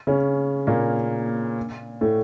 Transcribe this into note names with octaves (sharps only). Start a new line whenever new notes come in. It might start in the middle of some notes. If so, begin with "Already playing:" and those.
C#3 C#4
A#2 A#3
A2 A3